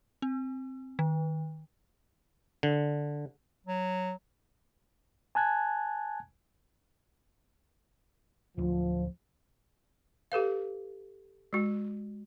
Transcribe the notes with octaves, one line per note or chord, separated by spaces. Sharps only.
C4
D#3
D3
F#3
G#5 A5 F#6 G#6
D1 D2 F3
G4 A4 B4 F5
G#3 F#4